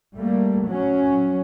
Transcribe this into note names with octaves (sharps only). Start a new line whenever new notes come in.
G3 A3 A#3
F#3 C#4